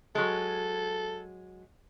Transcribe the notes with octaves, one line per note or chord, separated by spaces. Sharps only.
F#3 G#3 A4